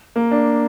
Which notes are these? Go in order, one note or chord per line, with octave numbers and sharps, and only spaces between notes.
A#3
D4